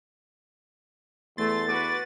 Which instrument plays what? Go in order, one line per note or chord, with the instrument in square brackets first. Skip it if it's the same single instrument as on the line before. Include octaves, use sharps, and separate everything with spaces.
[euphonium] E2 [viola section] A3 [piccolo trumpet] C6 [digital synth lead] A6
[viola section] F#4 B4 [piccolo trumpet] D6